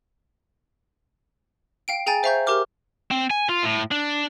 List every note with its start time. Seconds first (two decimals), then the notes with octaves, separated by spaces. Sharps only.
1.88 F5 G5 D7
2.06 G#4 G5 G#5 A#5 A6
2.23 C5 E5 F5 A#5 C#6 G6
2.47 G4 A#4 C#6 D6 F6
3.11 C4
3.31 G#5
3.50 F4
3.63 A2
3.91 D4